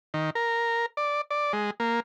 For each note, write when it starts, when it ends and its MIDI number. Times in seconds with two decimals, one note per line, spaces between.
0.14 0.30 51
0.35 0.86 70
0.97 1.21 74
1.31 1.53 74
1.53 1.71 56
1.80 2.00 58